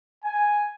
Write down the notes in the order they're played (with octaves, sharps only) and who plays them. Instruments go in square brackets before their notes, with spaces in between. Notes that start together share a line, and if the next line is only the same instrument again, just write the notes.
[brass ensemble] G#5